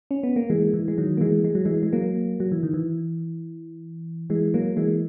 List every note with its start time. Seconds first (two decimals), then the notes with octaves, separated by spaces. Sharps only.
0.11 C#4
0.23 B3
0.36 A#3
0.50 E3 G#3
0.74 E3
0.88 G#3
0.98 D#3 F#3
1.17 A#3
1.21 E3 G#3
1.44 G#3
1.55 F#3
1.65 E3 G#3
1.83 G#3
1.93 F#3 A#3
2.40 F#3
2.52 E3
2.63 D#3
2.74 E3
4.30 E3 G#3
4.54 F#3 A#3
4.77 E3 G#3